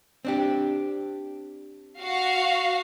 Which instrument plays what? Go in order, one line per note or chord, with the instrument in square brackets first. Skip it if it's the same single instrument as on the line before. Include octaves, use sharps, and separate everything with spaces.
[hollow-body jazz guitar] C4 D4 G4
[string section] F#4 F5